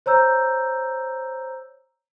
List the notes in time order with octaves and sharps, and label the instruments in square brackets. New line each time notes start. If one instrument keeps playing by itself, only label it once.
[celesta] C5 C#5 A#5 E6 G6